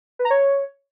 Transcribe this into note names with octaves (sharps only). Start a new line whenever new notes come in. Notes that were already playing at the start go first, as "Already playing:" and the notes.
B4
A#5
C#5